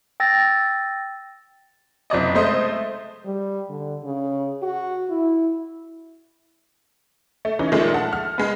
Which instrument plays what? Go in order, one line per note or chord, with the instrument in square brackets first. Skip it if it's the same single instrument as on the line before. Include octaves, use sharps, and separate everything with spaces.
[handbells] G5 E6 A6 A#6
[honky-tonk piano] F#1 C3 D5 D#5
G#3 A3 C5 D#5
[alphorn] G3
D3
C#3
F#4
E4
[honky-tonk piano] A3
E3 C#4 D#4
A#2 D#3 F3 G#3 A3
E5 F#5 A5
F6
G#3 B3